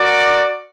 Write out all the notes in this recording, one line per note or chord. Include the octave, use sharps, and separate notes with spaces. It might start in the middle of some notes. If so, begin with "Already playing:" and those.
Already playing: F#4 A#4 D5